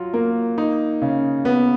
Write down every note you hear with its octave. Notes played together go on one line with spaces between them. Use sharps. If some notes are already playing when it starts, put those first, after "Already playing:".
Already playing: F#3 F4
A#3
D#4
C#3
B3